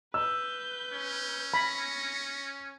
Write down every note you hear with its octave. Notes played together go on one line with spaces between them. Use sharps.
B4 E6 G6
C#4
B5 A#6 C#7